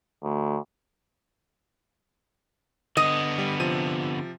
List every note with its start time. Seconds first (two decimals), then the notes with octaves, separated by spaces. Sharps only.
0.23 D2
2.97 D3 B3 D#5
3.38 G3
3.60 C3 F3 D#7